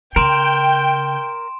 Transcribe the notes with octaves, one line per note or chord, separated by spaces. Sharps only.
C#3 A#4 G5 C6 D7 E7